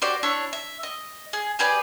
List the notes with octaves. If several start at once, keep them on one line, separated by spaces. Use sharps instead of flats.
F#4 G4 C5 D5
D4 E4 C#5 C#6
E5
D#5
G#4
G4 G#4 B4 D5